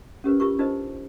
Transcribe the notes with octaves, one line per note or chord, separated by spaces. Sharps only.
C#4 G4 A#4 B4
F4 G4 A#4 C#6
D4 D#4 F4 A#4 C5 D#5